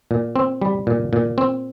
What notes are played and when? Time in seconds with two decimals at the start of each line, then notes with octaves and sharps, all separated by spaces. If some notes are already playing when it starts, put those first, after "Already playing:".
0.11 A#2
0.36 C4
0.61 G3
0.87 A#2
1.13 A#2
1.38 C4